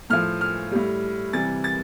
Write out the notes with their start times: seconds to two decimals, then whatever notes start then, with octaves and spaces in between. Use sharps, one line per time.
0.10 A2 F3 F6
0.41 F6
0.71 A2 G3
1.33 C3 E3 G3 A6
1.64 A6